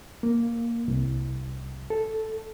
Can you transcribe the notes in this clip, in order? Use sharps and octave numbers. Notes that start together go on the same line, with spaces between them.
A#3
C2
A4